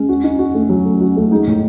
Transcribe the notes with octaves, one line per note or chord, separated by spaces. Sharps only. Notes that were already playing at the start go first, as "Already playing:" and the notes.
Already playing: G#3 C#4
F#4
D#4
F#4
A3
F#3
A3
F#4
A3
G#3 D#4
A2